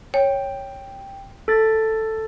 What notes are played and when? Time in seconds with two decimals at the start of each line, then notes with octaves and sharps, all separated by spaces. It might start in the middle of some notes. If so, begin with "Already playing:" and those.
0.14 C#5 G5
1.48 A4 A6